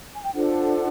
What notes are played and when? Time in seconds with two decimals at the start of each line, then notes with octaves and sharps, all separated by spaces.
0.14 G#5
0.24 G5
0.34 D4 F4 A4 C5 F#5